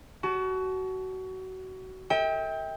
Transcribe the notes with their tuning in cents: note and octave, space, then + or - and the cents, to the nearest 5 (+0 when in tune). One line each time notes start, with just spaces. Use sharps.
F#4 +25 A5 -30
A4 +35 E5 -40 G5 +15